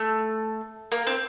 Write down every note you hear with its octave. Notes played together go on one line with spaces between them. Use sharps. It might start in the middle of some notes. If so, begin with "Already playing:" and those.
Already playing: A3
A#3
C4